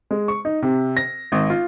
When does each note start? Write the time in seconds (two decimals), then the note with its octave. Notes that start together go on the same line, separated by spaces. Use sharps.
0.11 G#3
0.28 C#6
0.45 D#4
0.62 C3
0.97 A#6
1.32 G#1
1.50 F4